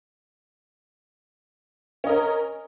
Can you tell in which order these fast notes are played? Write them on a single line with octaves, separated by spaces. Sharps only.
C#4 D#5 A#4